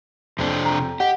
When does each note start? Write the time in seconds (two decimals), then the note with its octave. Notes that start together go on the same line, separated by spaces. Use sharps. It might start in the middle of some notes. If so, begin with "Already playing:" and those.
0.39 F2 C3 C4 D4
0.65 A#5
1.00 G4 D#5 F#5